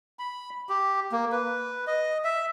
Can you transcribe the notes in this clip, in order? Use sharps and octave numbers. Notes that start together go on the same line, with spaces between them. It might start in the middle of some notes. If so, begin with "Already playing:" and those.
B5
G4
A#3
B4
D#5
E5